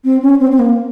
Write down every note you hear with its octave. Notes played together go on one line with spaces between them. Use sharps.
C4
C#4
C4
C4
A#3